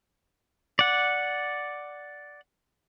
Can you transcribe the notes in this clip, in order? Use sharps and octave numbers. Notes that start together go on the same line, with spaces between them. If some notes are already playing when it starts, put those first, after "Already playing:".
D5 F#5